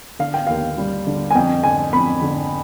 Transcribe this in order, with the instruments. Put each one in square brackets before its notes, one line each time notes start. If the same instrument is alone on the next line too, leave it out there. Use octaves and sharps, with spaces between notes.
[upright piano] D3 F5
G5
D#2 F5
G3
D3
G#5
F2 G5
D3 G#5
F2 B5
D3